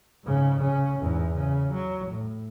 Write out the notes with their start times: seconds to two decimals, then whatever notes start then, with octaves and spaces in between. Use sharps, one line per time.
0.24 G#2 C#3
0.60 C#3 C#4
1.00 E2 G#2
1.35 C#3
1.74 F#3
2.11 A2